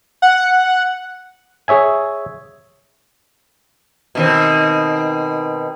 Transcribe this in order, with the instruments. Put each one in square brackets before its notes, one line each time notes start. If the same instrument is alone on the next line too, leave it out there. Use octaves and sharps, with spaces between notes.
[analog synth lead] F#5
[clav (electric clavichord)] G#4 C#5 E5 G#5
[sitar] B2 D#3 C4